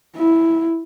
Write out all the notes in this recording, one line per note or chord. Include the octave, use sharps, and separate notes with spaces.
E4